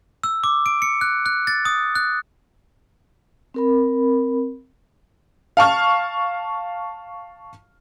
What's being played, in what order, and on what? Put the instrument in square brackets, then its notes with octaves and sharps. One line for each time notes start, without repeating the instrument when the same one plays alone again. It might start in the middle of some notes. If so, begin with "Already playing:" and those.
[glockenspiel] E6
D6
D7
C#7
F#6
F#6
A6
D#6
F#6
[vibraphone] C4 A#4 B5
[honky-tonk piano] F5 A5 C#6 F6